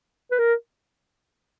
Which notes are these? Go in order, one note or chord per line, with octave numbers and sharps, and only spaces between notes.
B4
A#4